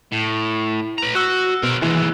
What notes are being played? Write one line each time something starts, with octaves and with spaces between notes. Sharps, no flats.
A2
B4 A#5
F#4 E6 F#6
B2 A#4 C5
D#2 E3 G#3